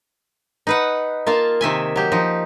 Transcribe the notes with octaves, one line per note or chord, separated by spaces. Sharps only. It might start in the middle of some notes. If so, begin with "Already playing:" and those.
D#4 B4 F#5
A#3 F4 F5 A5
C3 D#3 E5 G#5
F#3 G4
F3 D#4